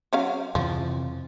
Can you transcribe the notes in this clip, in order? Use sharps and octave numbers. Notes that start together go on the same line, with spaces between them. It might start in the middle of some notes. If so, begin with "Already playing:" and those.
F#3 C#4 F5
F2 C3 E3 F3